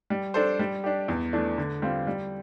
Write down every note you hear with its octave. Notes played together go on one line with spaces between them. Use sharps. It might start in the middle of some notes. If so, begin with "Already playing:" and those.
G3
D4 A4 C5
G3
D4 G4
E2
E3 A3 D4
D3
G3 C4 F4
G3